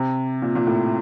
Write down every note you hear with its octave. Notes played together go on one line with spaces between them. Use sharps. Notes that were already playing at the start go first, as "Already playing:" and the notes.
Already playing: C3
A#2
A#2
A2